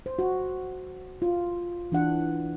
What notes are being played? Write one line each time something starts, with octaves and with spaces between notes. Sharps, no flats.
C5
F#4
F4
E3 D4 F#5